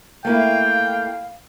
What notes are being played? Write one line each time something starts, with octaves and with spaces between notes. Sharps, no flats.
A3 A#3 E4 F5 G5